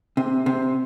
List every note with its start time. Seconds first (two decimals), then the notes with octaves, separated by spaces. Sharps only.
0.17 C3
0.46 C3